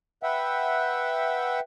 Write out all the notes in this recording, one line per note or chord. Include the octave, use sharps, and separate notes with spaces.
B4 E5 F#5 G5